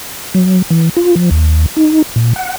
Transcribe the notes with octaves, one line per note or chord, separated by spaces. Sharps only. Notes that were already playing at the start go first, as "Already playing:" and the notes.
F#3
E3
F4
F3
D#2
D#4
A#2
F#5